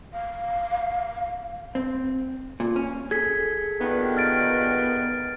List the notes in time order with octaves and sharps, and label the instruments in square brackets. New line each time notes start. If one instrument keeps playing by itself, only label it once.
[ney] F5
[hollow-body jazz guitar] C4
A#2
C#4
[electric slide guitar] G#4 A4 [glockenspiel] G#6 B6
[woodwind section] G2 A#2 D#3 [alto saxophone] B3
[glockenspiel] F6 A6 D7